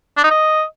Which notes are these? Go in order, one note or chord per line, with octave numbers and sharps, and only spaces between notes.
D4
D#4
D#5